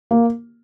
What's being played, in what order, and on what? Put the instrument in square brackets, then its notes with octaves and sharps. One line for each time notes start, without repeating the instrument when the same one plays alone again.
[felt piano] A#3